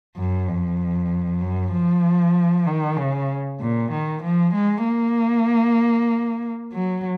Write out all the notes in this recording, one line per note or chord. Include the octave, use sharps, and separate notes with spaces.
F#2
F2
F#2
F3
D#3
C#3
A#2
D#3
F3
G#3
A#3
F#3